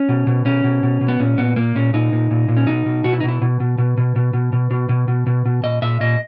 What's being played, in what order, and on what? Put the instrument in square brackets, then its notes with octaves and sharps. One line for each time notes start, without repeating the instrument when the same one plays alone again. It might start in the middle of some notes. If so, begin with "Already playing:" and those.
Already playing: [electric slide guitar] C#4
B2
B2
B2 C#4
B2
B2
B2
B3
A#2 C#4
A#2 B3
A#2 A#3
A#2 C#4
A#2 D#4
A#2
A#2
A#2
C#4
B2 D#4
B2
B2 F#4
E4
D#4
B2 E4
B2
B2
B2
B2
B2
B2
B2
B2
B2
B2
B2
B2
A#2 D#5
A#2 E5
A#2 D#5